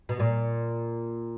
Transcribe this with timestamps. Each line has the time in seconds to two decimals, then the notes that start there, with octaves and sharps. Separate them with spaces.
0.09 B2
0.20 A#2